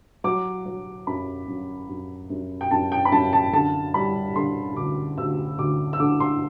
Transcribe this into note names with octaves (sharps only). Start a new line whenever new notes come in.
F#3 D6
F#3
F#2 B5
F#2
F#2
F#2
G5
F#2 A5
G5
B5
F#2 A5
A5
D3 A5
G3 B5
D3 C6
D2 D6
D2 E6
D2 D6
E6
D3 D6
C6